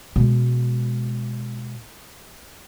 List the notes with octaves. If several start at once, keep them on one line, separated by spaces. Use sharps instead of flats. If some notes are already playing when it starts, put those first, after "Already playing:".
B2 G#3